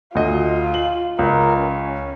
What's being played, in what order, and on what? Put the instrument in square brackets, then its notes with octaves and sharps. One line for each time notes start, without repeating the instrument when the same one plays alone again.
[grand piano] D2 D#5 [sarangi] F4
[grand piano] F#7
[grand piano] C#2 [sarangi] A#4
[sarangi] C#4